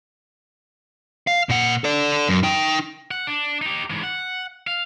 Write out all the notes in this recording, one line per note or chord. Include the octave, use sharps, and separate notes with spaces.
F5
A#2 F#5
A4 D5
F#2
D#4 G5
F#5
D4
D#4 G4
G#2 E3
F#5
F5